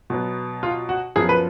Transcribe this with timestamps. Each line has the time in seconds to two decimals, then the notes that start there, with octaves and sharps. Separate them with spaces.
0.10 B2 F#3 B3
0.63 F4
0.89 F#4
1.16 F#2 F3 B3 G#4
1.29 B4